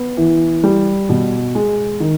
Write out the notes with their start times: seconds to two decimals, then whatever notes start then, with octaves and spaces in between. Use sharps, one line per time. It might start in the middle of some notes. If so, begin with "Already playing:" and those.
Already playing: B3
0.17 E3
0.63 G3
1.09 B2
1.55 G#3
2.00 D#3